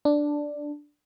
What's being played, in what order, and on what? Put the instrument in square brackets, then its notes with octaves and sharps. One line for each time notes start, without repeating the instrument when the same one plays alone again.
[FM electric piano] D4